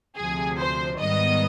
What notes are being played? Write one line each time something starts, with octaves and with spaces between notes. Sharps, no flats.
D2 C3 F3 G#4
C5
G#2 D#3 G3 B3 D#5